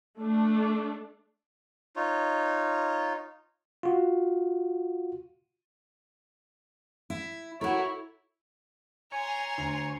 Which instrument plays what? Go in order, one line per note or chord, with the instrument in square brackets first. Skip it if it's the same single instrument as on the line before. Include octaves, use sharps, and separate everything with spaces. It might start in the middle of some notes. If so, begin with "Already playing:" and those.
[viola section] A3 D4
[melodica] D#4 F4 C#5
[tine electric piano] F4 F#4
[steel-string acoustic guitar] E4
[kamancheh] E4 [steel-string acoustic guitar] F#4 A#4 [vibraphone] A4 [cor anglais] C#5
[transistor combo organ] C#5 [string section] G#5 [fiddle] A#5 C6
[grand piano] D2